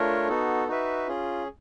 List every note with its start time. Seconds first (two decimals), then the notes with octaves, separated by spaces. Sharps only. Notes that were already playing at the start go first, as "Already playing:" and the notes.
Already playing: A3 D4 F4 A#4 C#5
0.28 B3 D#4 F#4 A4
0.68 D#4 F#4 B4 E5
1.08 C#4 F4 G#4